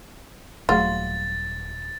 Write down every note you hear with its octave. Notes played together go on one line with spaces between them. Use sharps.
D#1 F#3 A3 F4 G#4 A6